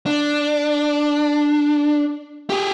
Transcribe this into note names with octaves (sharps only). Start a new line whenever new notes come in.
D4
G4 G#4